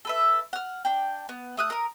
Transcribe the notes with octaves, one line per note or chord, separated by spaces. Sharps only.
A4 B4 E5
F#5 F6
D4 G5
B3
A3 D#6 F#6
A#4 D#6